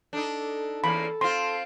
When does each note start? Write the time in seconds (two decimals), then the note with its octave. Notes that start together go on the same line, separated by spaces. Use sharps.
0.13 D4 D#4 A4
0.84 E2 A#3 C#4 B5
1.21 C4 F4 C6